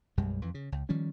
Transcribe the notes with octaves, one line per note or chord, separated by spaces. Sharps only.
B1 F#2 G3 G#3
F2 E3
C#3
C#2
D#3 F3 G3 C#4